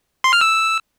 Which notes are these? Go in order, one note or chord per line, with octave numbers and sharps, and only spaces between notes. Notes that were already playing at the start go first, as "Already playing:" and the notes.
C6
F6
E6